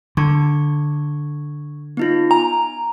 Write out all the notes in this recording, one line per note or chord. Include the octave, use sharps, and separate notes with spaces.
D3 C#6 G#6
B3 D#4 F4
G#5 A#5